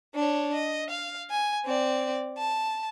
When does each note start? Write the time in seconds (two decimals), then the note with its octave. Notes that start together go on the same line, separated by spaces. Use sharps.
0.15 D4 C#5
0.54 D#5
0.90 F5
1.30 G#5
1.65 C4 D5
2.38 A5